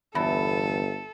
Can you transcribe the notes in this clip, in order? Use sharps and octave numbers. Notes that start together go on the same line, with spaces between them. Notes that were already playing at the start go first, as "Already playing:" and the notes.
G1 E2 A4